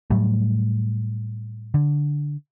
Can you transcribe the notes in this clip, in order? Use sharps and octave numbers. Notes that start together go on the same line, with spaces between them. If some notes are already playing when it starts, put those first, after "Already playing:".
A2 F#3 G3 A3
D3